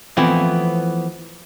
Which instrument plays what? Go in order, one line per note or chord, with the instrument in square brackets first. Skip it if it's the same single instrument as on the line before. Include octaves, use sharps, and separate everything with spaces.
[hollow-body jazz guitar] E3 F3 A3 B3 C4 E4